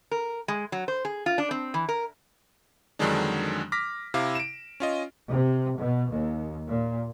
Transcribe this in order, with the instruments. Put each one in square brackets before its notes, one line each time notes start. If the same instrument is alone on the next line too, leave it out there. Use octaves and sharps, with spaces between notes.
[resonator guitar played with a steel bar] A#4
G#3
F#3
C5
G#4
F4
D4
C4
E3
A#4
[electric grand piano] F2 D3 D#3 F#3 G#3 D4
D6 F6 A#6 B6
C3 E4 F5 D6
D7 E7
C#4 F4 D#5
[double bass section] C3
B2
D#2
A#2